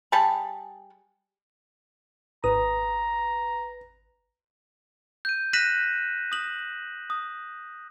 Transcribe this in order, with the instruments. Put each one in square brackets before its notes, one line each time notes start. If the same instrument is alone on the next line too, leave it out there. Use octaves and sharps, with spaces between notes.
[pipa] G3 G#4 A5 B5
[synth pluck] G#1 D#6 [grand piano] B4 [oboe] A#5
[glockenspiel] G6 D#7
F#6 A#6 B6 D#7 E7 F#7
D#6 A#6 E7 F#7
D#6